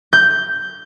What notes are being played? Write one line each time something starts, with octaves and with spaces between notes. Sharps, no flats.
G6